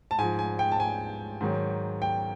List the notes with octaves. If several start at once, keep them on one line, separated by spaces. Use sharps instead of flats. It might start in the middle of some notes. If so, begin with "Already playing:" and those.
A5
G#2 F3 G#5
G#5
G5
A5
G#5
G#2 D#3 F#3
G5